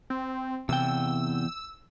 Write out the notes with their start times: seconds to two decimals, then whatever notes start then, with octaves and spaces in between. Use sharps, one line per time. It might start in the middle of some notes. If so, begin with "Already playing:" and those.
0.10 C4
0.69 E2 C3 G5 E6